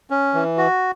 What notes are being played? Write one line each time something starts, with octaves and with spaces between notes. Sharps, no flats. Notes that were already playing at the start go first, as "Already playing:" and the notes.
C#4
E3
F#4